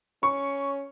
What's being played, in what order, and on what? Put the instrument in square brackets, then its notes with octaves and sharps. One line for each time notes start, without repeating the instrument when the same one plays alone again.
[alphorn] C#4 [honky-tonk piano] C#6